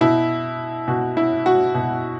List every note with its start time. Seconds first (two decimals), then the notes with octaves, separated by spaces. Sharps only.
0.01 B2 E4
0.88 B2 F#4
1.17 E4
1.46 F#4
1.74 B2